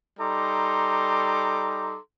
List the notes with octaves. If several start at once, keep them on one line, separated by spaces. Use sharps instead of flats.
G3 D#4 A4 A#5 C6 D6